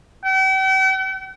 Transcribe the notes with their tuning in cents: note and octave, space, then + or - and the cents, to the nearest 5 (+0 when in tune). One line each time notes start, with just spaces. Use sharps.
G5 -45